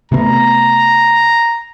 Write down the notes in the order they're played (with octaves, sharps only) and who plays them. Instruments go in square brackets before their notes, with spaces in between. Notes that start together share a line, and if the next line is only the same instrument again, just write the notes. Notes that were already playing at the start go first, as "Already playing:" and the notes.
[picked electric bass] C3 A3 B3 [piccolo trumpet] A#5